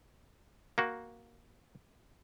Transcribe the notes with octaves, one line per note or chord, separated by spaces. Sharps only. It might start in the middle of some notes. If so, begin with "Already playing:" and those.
A#3 F#4